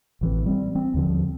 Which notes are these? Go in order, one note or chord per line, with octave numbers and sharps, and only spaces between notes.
A1 E3 C4
G3 C4
C4
D#2 D3 F3